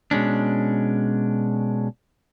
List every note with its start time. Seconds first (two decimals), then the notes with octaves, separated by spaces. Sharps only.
0.11 B2 G#3 C#4 D4